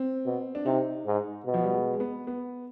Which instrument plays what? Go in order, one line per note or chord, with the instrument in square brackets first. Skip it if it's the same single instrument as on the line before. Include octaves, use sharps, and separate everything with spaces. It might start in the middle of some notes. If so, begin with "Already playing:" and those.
Already playing: [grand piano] C4
[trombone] B2
[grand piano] D4
[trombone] C3 [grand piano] D#4
[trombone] G#2
B2
[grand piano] F3
G3
G#3
G#3
B3
B3